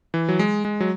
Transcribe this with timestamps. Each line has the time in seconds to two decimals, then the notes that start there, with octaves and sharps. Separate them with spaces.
0.14 E3
0.29 F#3
0.39 G#3
0.65 G#3
0.80 F#3